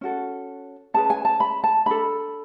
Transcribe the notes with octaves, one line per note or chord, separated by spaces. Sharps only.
C#4 F#4 A4
C#4 G#4 B4 A5
G#5
A5
B5
A5
D4 A4 B5